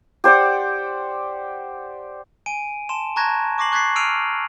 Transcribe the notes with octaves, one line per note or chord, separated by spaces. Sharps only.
G4 C5 D5 F#5
G#5 D7 D#7
A5 C6 E7
A5 A#5 C#6 F#6 G#6 A#6
C#6 D6 A#6 C7 F#7
C#6 F#6 G#6 A6 B6 C7
E6 F6 C7 D7 D#7 F7